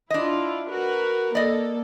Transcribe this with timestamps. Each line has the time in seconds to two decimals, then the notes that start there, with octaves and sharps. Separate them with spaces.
0.10 D4 E4 F4 D#5
0.70 F#4 A#4 B4
1.35 A#3 A4 D5 D#5